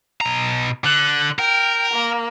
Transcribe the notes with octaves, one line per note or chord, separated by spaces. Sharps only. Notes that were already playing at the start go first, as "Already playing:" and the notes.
B2 A#5
D3 F#6
A#4 G5
A#3